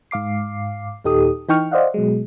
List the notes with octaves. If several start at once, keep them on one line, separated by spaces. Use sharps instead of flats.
G#2 F5 D6 C7
D#2 A#2 D#4 G4 A4 D#6
E3 D#4 G5 C#6 F6
C5 D5 D#5 F5 F#5
B2 F#3 G#3